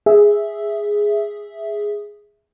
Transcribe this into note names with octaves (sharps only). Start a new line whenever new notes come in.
G#4 E5